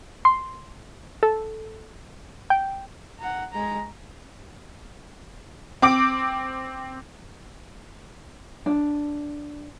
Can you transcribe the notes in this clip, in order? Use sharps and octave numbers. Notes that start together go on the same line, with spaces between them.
C6
A4
G5
F#5 A#5
G#3 A#5
C4 D6 D7
D4